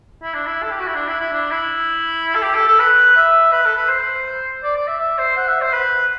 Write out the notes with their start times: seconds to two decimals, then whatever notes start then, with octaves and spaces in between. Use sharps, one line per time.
0.23 E4
0.34 D4
0.47 E4
0.63 A4
0.71 G4
0.79 F#4
0.87 E4
0.95 D4
1.08 E4
1.20 E4
1.33 D4
1.51 E4
2.35 A4
2.43 G4
2.55 A4
2.67 A4
2.79 B4
3.17 E5
3.52 B4
3.65 A4
3.77 B4
3.89 C5
4.63 D5
4.76 D5
4.88 E5
4.99 E5
5.18 C5
5.37 F#5
5.48 E5
5.61 C5
5.74 B4